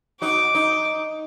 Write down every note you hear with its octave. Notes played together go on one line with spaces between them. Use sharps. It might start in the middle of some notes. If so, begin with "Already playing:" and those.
D#4 F#4 D6
D#4